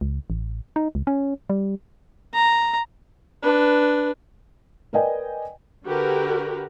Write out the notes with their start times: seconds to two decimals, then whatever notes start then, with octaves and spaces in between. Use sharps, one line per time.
0.01 C#2
0.30 A1
0.76 D#4
0.95 C#2
1.07 C#4
1.50 G3
2.34 A#5
3.42 D4 B4
4.93 A#4 B4 D5 D#5 G5 G#5
5.86 D3 F#4 G4 A#4 B4